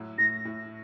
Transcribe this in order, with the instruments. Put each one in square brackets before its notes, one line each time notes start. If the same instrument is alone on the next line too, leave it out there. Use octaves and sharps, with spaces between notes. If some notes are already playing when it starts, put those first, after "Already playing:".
Already playing: [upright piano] A2 F#3
[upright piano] A2 [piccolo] A#6
[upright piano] A2